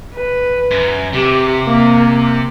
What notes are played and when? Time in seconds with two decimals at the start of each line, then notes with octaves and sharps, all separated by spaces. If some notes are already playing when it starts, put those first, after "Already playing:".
0.14 B4
0.71 F#2
1.13 C3 G4
1.67 A#3